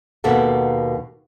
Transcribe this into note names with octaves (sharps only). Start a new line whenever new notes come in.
D#2 B2 A#3 A4 F#5